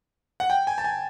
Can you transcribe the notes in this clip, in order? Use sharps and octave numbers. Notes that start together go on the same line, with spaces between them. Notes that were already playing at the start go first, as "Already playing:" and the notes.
F#5
G5
G#5
A5
G#5